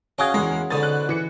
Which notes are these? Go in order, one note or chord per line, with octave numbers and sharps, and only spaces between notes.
C#4 F#4 G#4 D#5 F5 G5
E2 G#3 A#4
G#2 B2 D3 D#6 A6
F#6
E3 C#7